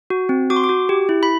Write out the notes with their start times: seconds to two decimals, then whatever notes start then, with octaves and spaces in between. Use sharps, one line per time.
0.10 F#4
0.29 C4
0.50 F#4 D6
0.56 C6
0.64 D6
0.69 F#4
0.89 G4
1.09 E4
1.23 B5